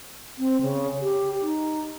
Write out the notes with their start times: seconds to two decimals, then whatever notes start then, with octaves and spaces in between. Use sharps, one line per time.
0.38 C4
0.61 C#3
1.01 G4
1.42 D#4